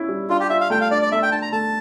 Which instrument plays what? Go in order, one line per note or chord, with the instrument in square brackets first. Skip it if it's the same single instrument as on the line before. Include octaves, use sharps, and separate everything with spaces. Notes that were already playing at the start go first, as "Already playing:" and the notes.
Already playing: [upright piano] C#4 E4
G3
[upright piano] D4 [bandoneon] F4
[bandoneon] G4
[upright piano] F4 [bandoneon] E5
[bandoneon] F5
[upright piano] A3 [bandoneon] G5
[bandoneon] F5
[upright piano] D4 [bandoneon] D5
[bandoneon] D5
[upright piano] A3 [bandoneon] E5
[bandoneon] G5
[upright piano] D4 [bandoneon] A5
[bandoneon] A#5
[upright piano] A3 [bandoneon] A5